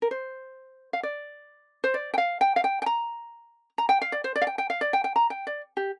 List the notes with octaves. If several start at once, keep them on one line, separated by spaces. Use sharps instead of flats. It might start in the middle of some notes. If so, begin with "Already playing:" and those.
A#4
C5
F5
D5
C5
D5
G5
F5
G5
F5
G5
G5
A#5
A#5
G5
F5
D5
C5
D5
F5
G5
G5
F5
D5
G5
G5
A#5
G5
D5
G4